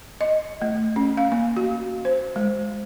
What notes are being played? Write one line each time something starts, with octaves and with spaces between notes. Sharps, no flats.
D#5
A3
C#4
F5
A#3
F#4
C5
G#3